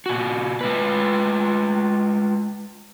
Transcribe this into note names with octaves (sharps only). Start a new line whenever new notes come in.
A#2 F#4
G#3 F4 B4